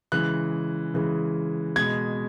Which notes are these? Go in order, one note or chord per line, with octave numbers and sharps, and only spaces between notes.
C#3 E3 G#3 F#6
C#3 E3 G#3
B2 G#3 G#6